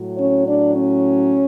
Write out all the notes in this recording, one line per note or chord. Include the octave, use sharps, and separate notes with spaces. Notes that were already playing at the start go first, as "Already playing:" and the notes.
Already playing: A2 F#3
C#4 C#5
D4 D5
C#4 C#5